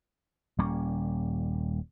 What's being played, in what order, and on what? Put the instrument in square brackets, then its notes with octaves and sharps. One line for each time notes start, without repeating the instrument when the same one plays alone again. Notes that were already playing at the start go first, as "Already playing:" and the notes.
[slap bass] D#1 G3 A#3 C#4